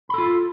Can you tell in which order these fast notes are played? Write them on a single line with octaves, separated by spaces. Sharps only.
B5 A4 F4